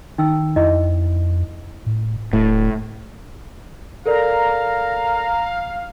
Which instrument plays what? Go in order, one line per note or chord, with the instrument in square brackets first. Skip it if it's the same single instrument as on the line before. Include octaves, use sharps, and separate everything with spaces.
[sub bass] D#3 [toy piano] D#4 G5 E6
[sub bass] F2 [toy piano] E4 D#5 E5
[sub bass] A2
[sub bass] D#1 [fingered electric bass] A2
[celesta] A4 A#4 D5 [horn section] F5 [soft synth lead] A#5